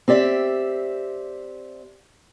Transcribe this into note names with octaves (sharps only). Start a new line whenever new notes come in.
C4 G4 D5 E5